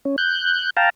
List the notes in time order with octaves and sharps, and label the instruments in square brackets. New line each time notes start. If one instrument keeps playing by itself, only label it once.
[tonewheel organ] C#4
F#6 G6
F5 G5 A5 A#5